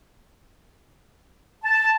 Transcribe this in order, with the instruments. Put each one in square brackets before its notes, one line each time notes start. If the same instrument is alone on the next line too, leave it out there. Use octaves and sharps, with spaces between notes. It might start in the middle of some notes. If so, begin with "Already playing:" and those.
[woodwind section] A5